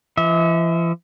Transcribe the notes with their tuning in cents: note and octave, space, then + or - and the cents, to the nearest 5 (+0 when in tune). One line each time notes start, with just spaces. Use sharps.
E3 +45 E5 -40